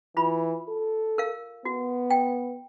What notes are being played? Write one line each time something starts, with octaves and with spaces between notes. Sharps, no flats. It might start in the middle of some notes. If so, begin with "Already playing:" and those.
E3 F4 B5
A4
A#4 F5
B3 F#4
G5